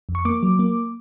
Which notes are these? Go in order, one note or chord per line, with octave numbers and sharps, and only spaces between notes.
F2
C#6
A#3 D6
F#3
A#3